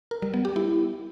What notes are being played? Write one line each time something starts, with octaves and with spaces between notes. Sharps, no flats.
A#4
G3
B3
G4
E4